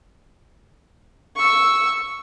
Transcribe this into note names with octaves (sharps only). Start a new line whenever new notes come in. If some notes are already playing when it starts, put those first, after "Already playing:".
C#6 E6